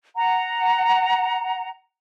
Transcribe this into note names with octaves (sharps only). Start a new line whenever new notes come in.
F#5 A#5